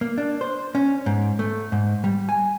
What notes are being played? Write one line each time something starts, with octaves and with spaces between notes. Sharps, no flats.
A#3
D4
C5
C#4
G#2
A3
G#2
G3
G#5